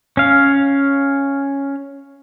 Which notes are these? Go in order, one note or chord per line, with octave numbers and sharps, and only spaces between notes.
C#4 F5